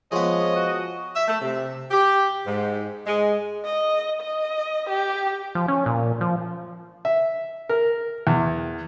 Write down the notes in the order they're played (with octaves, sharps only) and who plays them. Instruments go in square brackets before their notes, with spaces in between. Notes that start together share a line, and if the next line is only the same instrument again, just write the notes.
[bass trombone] F3 [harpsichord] G#3 B3 [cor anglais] C#5 [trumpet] D#5
[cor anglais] F#4
[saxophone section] E5
A3
C3
G4
G#2
G#3
[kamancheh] D#5
D#5
G4
[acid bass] F3
C#4
A#2
F3
[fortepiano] E5
A#4
E2